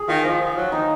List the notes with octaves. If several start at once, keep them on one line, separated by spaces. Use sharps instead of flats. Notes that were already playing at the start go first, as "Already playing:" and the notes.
Already playing: G#4
D#3 F4
F3 F4
F3
F#3
D#3 D#4